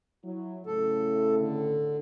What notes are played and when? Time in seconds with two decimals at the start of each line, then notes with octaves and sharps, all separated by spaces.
0.25 F#3 E4
0.66 A2 C#3 A4
1.37 D3